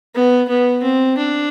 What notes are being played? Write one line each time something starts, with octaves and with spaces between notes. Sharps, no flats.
B3
B3
C4
D4